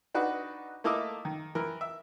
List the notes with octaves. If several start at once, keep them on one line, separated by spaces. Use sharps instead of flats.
D4 D#4 F#4 B4
A3 A#3 E4 A4 D#5 D6
D#3
E3 A#4
E5